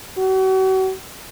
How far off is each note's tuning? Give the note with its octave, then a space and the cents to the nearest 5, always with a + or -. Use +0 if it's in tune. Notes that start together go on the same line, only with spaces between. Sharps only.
F#4 +40